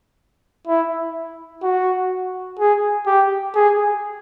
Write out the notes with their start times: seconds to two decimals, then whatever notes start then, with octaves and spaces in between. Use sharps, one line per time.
0.67 E4
1.63 F#4
2.59 G#4
3.07 G4
3.55 G#4